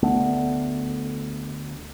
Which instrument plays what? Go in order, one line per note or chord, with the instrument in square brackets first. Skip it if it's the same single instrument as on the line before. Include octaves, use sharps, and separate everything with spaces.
[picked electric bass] D2 A3 B3